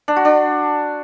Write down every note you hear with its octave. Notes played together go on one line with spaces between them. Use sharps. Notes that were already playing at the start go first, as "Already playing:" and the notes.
D4
F#4
D4